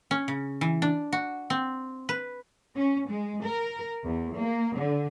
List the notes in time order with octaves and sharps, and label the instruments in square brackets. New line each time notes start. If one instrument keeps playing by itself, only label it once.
[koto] C#4
C#3
E3
D4
F#4
C4
B4
[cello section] C#4
G#3
A#4
E2
A#3
D3